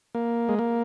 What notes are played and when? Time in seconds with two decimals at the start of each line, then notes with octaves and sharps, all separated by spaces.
0.15 A#3
0.49 G#3
0.59 A#3